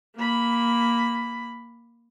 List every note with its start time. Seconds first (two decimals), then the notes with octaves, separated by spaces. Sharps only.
0.16 A#3 B5